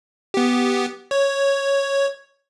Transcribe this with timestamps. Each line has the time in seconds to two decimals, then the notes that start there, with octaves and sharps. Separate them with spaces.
0.34 B3 G4
1.11 C#5